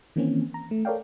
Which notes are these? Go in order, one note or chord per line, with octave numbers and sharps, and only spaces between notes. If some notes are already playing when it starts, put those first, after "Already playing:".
D#3 E3 A#3 C4 C#4
A#5
A3
A4 A#4 C#5 D5 F5 G5